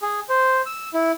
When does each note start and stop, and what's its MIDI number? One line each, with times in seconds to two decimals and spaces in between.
0.02 0.20 68
0.29 0.61 72
0.66 0.89 88
0.94 1.12 64